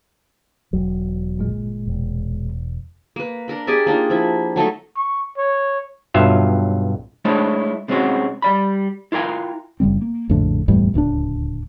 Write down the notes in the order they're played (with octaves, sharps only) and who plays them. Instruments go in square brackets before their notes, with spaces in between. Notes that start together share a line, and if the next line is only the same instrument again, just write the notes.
[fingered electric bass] E1 B1 F#3
[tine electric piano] G1 A#2 G#3
[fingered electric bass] E1
[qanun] A#3 B4
D4 A#4 B5
G4 G#4 D5 E5
A#3 D4 D#4 F4
F3 E4
F#3 A3 D#4 A4
[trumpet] C#6
C#5
[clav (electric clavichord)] B1 G2 F#3 F4 E5 F5
[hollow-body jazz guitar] G#3 A3 D4 E4 C5 C#5
C3 G#3 C4 C#4 F#4
G3 D5 B5
E4 F4 A#4 G5 G#5
[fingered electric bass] F#1 C#3 G3 C4
A#3
A#1 F2 A2 D3
F#1 E2 A2 G3
D1 C#2 C#4 D4